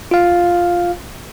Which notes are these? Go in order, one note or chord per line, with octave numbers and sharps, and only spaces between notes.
F4 F5